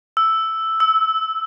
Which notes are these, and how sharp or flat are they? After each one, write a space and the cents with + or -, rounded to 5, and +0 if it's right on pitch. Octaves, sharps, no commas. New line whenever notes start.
E6 +0
E6 -20